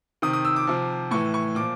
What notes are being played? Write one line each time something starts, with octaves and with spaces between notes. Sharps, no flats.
C3 D#3 D#6
D#6
E6
D6
C3 F3
A2 E3 C#6
C#6
A#2 F3 D6